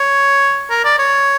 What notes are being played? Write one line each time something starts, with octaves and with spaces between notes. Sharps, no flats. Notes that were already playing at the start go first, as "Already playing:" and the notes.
Already playing: C#5
A#4
D5
C#5